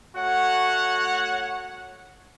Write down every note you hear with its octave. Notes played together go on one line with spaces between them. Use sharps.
A3 F#4 C#5 F#5